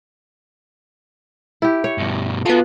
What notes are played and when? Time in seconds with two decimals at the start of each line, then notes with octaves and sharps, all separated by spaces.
1.62 E4 G4
1.84 C#5
1.98 G2 B2
2.46 B3 F4 F#4 A4